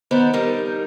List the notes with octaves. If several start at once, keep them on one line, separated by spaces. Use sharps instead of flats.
D#3 B3 C5 D5
G3 D#4 A#4